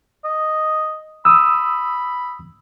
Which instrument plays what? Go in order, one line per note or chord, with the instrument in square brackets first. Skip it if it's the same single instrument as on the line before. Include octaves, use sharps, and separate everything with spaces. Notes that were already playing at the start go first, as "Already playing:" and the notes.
[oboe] D#5
[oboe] B5 [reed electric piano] D#6 E6